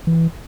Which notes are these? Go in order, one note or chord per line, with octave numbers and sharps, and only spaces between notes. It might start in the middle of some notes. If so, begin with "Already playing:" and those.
E3